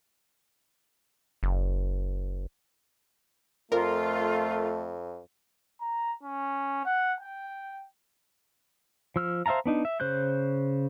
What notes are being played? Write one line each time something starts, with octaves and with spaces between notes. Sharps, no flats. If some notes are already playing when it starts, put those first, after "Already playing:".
F#1
F2 A3 F4 A#4
A#5
C#4
F#5
G5
F3 E6 F6
C5 E5 F5 A5 A#5
B3 D4 D#4
E5
C#3 C5 F#6 G6